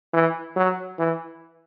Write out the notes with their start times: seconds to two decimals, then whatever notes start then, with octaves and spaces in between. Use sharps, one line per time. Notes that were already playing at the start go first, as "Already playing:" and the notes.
0.13 E3
0.56 F#3
0.99 E3